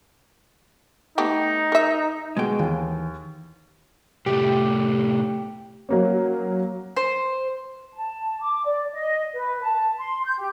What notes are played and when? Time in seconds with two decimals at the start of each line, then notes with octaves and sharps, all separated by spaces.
1.18 A3 B3 D#4 G4
1.72 A#4 E5
2.37 B2 G#3 F#4 G#4 G5
2.59 D#2 E3
4.26 A2 C3 A3 G4
5.89 F#3 A#3 C#4
6.96 C5
7.94 A5
8.41 D6
8.65 D5
8.92 D#5
9.34 B4
9.62 A5
9.98 C6
10.24 G6
10.38 G4